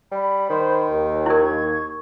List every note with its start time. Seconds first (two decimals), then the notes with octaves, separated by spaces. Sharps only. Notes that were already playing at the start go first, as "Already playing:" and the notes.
0.12 G3 B5
0.50 D#3 C5
0.88 D#2
1.26 E4 A#4 C#6 G#6